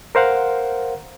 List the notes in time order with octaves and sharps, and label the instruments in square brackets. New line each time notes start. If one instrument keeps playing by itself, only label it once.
[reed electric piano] A#4 C5 F5 F#5